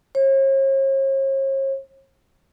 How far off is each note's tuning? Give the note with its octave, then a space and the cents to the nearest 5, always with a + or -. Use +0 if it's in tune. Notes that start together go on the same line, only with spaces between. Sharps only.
C#5 -45